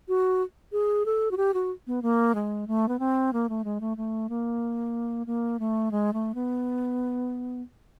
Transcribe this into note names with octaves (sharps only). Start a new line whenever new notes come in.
F#4
G#4
A4
F#4
G4
F#4
B3
A#3
G#3
A3
B3
C4
A#3
A3
G#3
A3
A3
A#3
A#3
A3
G#3
A3
B3